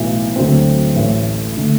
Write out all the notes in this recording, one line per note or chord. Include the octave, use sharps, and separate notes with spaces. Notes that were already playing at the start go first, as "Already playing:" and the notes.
Already playing: B1 A2 E3
D2 D3 F#3 A3 C4
A1 A2 E3 A3
D3 A3